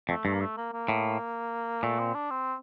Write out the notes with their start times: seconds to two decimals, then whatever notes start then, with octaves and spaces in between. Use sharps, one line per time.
0.09 F2 A3
0.25 G2 A3
0.33 A#3
0.40 A3
0.57 A#3
0.72 A#3
0.89 A2
1.83 A#2 A3
1.99 C4
2.14 D4
2.30 C4